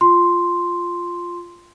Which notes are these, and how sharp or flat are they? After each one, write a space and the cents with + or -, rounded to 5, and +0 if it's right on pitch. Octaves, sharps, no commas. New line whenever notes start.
F4 +0 C6 +0